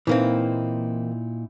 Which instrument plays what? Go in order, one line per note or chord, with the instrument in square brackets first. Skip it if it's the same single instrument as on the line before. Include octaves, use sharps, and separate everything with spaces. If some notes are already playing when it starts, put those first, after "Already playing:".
[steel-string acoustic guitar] A#2 D#4 E4 [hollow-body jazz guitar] E3 A#3 C4